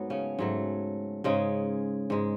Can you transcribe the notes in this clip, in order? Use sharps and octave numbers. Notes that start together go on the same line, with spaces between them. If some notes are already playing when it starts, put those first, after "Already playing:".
Already playing: G#2 F#3 A3 B3
C#3 C#4
G#2 F#3 A3
G#2 C#3 G#3 C#4
G#2 G#3